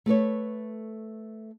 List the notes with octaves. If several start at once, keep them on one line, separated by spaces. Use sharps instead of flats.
A3 A4 B4 C#5